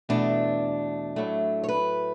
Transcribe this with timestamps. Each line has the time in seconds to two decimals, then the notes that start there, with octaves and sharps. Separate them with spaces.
0.09 E2 B2 A3 D4
1.16 A2 F#3 A3
1.64 C#5
1.69 B4